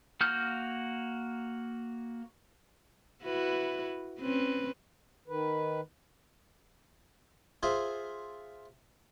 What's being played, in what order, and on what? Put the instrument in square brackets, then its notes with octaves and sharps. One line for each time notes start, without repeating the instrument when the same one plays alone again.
[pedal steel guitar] A#3 F#4 F6 G6
[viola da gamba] E4 F#4 B4
C4 C#4 B4
[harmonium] D#3 B4
[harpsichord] F4 G#4 C5 E5